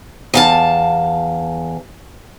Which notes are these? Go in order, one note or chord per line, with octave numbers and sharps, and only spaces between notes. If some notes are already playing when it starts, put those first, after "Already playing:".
E2 F5 A5